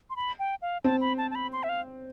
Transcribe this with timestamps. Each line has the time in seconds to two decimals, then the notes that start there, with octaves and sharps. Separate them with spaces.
0.10 C6
0.16 B5
0.39 G5
0.62 F5
0.84 C4 A5
1.01 B5
1.18 A5
1.31 A5
1.35 B5
1.53 C6
1.63 E5
1.69 F5